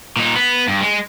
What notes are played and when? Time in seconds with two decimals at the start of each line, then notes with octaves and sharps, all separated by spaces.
0.16 A#2 D#4
0.36 B3
0.68 G2
0.81 G#3